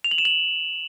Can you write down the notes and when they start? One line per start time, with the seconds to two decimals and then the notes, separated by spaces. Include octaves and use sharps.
0.04 F7
0.11 F#7
0.18 E7
0.25 F#7